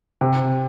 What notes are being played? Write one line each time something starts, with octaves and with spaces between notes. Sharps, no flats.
C3